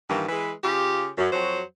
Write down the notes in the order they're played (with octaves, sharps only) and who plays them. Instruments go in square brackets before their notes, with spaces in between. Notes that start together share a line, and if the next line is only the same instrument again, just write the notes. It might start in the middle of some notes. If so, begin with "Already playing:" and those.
[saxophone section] G2 D#3 E3 A#3
E3 G#3 B4
C#3 F4 G4
F#2
F2 F#3 F#4 C5